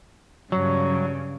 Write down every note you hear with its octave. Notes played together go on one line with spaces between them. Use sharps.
G2 C#3 F#3